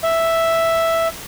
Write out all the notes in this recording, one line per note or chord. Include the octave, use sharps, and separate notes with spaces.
E5